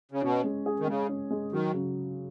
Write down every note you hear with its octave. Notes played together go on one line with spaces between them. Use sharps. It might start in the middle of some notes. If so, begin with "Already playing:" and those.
C#3
B2 C#4
G#3
G#4
D#3
C#3 G#3
C#4
G#3
D#3 F#3
C#3